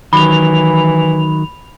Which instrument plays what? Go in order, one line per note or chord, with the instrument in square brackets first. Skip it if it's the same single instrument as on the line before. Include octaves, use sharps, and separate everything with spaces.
[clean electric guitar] D#3 F#3 [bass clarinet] E3 [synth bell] B5 F7